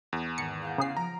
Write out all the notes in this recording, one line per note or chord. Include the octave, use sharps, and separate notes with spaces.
E2
G#1 C#7
F5 F#5 G6
C#3 G#4 C7
F3 A#5 D7